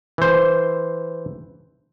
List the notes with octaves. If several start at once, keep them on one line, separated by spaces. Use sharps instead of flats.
E3 C5